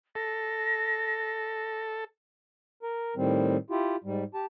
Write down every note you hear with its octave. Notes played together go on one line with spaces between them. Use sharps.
A4 A#6
A#4
A2 D#3 G3 C4
E4 F4 G4
G#2 G3
G4 A5